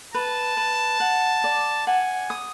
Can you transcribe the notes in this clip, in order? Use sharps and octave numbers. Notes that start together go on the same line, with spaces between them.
B4 A5
B4
F#5
D5
F#5 G#5
D#6